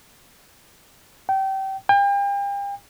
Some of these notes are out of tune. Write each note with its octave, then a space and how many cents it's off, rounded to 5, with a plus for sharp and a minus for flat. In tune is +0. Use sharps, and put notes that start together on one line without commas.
G5 -25
G5 +40